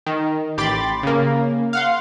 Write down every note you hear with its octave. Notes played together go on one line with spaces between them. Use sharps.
D#3
A1 G4 B5 C6 D6 A6
C#3 A#3
F5 F#5 C6